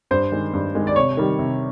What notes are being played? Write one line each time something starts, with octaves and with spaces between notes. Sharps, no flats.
G2 C5
D#3 G#3
G2
D#3 G#3
D5
C3 C#5
D#3 G3
C3